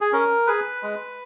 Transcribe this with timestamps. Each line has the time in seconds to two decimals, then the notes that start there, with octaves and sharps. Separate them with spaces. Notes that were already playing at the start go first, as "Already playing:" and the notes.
0.01 G#4
0.12 C#4 A#4
0.47 G#4 B4
0.83 G#3